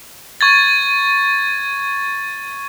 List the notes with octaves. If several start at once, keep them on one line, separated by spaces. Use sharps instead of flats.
C#6 G#6 A6